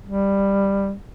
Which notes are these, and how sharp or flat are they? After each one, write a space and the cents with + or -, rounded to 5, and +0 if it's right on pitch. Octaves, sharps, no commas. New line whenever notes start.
G3 +10